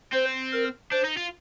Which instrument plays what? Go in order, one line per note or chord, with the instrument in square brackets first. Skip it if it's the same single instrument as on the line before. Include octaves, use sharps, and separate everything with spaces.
[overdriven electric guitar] C4 [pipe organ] C5
[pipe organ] A#4
[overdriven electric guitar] D4 [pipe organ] C5
[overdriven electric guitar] D#4
F4